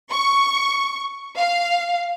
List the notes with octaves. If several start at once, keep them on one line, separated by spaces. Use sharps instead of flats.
C#6
F5